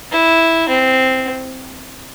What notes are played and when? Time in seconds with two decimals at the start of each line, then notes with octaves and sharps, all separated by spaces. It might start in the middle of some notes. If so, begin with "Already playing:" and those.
0.12 E4
0.69 C4